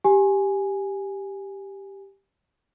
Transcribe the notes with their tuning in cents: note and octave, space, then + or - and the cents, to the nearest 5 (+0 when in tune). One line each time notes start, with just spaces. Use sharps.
G4 +0 G#5 +0